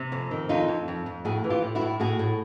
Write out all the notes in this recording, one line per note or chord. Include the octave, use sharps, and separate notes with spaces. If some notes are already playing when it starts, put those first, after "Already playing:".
Already playing: C3
F2
D#3
F2 D#4 F4
F2
F2
F2
A2 F#4 G#4
E3
F4 G4
A2
E4 F#4
A2
A2 F#4 G#4
A2